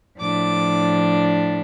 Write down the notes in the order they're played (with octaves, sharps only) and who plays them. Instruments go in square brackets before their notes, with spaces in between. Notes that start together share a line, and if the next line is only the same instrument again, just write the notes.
[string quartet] A2 F3 D4 D6